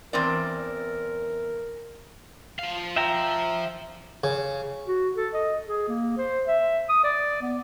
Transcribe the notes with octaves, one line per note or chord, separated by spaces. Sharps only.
E2 C4 A#4 D5
F3 F5
E5 G5 A#5
C#3
F#4
A4
D#5
G#4
A#3
C5
E5
D#6
D5
B3